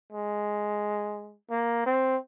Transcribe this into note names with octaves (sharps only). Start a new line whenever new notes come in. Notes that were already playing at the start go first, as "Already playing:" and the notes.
G#3
A#3
C4